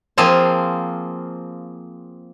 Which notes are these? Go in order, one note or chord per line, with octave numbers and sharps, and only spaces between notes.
F3 A#3 C4 G#4 F5 A5